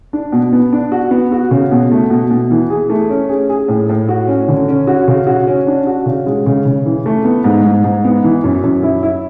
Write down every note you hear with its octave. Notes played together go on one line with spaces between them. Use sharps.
D4
B2
B3
D4
F#4
B3
F#4
C#3
B2
A3
B2
B2
E3
G#4
A3
C#4
G#4
G#4
A2
A2
F#4
C#4
D3
C#4
F#4
C#3
F#4
C#4
D4
F#4
C#3
G#3
C#3
C#3
E3
A3
B3
G#2
G#2
G#2
B3
E3
F#2
F#2
E4
E4